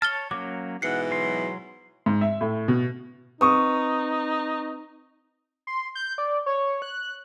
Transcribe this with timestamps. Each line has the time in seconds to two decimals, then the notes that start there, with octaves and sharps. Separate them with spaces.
0.02 C#5 A5 F6 A6 G7
0.31 F#3 A#3 C#4 D6
0.82 G#2 B2 E3 F#5 C7 C#7
1.11 F#3 C6
2.06 G#2
2.21 E5
2.41 A2
2.68 B2
3.41 C4 D#4 B4 C#6 D#6
5.67 C6
5.95 G6
6.18 D5
6.46 C#5
6.82 F#6